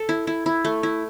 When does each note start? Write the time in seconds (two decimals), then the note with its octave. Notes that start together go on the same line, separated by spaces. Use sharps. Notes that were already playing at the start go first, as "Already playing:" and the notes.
Already playing: A4
0.09 E4
0.27 E4
0.46 E4
0.65 A3
0.83 E4